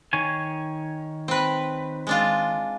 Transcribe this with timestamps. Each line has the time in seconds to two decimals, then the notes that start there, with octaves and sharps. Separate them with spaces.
0.13 D#3 C#5 G#5
1.28 C4 B4
2.07 G#3 D4 F4